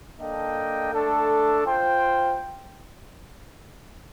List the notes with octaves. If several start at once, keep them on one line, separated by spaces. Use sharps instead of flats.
A#3 D4 A4 D#5 G5
A3 D4 A4
F4 C5 G5